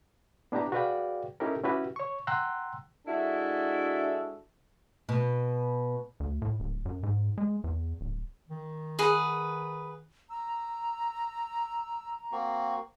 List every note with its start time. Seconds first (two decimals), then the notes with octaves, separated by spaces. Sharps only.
0.52 B3 D4 E4 G4 A#5
0.72 F#4 G#4 B4 D5 F5 G5
1.40 C#4 D#4 E4 G4 A4 A#4
1.64 C#4 E4 F#4 G4 B4
1.96 C#5 C#6
2.27 F#5 G5 A#5 C6 E6 F#6
3.07 G#3 D4 E4 F#4 A4 E5
5.09 B2
6.20 D2
6.42 A2
6.60 D1
6.86 F#2
7.03 G#2
7.38 G#3
7.64 E2
8.01 D1
8.49 D#3
8.99 G#4 B4 F#5
10.30 A#5 E6
12.32 A#3 C4 F#4